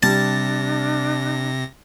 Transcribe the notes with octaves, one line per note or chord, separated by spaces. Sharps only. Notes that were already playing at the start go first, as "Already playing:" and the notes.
C3 G3 D4 A5 A#6